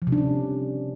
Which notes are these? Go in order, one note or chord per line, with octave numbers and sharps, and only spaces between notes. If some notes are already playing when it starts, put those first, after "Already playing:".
F3
C3
D4
C#4